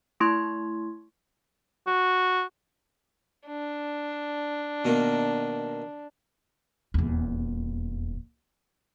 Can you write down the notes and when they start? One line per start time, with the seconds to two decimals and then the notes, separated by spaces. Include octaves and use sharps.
0.20 A3 E4 C6 C#6 G#6
1.87 F#4
3.46 D4
4.85 B2 D#3 A#3
6.94 D#1 E2